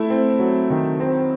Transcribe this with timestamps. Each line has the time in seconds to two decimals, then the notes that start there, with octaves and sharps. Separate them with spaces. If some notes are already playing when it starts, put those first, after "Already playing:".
Already playing: A3 E4
0.10 C4
0.39 F#3
0.70 D#3
1.00 C4